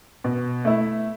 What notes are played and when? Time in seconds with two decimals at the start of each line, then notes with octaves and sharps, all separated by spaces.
0.24 B2
0.65 A3 E4